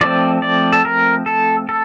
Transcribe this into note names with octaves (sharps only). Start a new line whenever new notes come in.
F3 A3 C4 D5
D5
A4
A#4
A4
A4